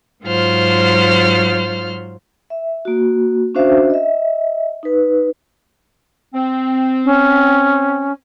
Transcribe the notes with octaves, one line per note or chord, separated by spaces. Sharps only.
G#2 F#3 F4 C5 F6
E5
A#3 F#4
C#4 D4 F#4 C5 E5 F5
D#5 E5
D#4 B4
C4
C#4